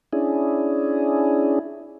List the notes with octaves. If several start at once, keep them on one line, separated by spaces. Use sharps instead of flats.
C#4 D4 E4 G#4